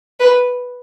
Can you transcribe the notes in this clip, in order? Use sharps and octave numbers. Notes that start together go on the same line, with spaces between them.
B4